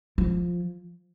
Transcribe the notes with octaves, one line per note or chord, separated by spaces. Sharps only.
F3